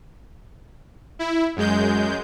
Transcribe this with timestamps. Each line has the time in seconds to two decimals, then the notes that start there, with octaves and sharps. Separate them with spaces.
1.19 E4
1.56 F#2 G#3 G6